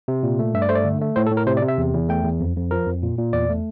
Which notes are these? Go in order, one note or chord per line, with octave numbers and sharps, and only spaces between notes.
C3
A#2
A3
G2 E5
D5
A3 C5
D5
D3
A3
A2 C5
A4
A2
A#4
C3 C5
D5
C3
E5
E2
E2
A3 G5
E2
F2
F2
F3 A#4
F2
A#2
A#2
E2 D5
A3